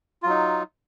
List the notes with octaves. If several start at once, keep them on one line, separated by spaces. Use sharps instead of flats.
F#3 D#4 F4